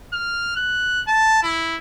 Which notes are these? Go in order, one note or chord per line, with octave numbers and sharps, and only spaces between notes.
F6
F#6
A5
E4